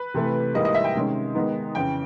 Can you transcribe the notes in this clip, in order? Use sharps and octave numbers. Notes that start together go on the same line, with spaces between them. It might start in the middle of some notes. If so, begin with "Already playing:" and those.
Already playing: B4
C3 E3 A3
G#2 E3 G3 A#3 D#5
D#5
E5
G5
C3 D#3 G#3 C#4
D#3 G#3 B3 D#4
F2 C#3 E3 G5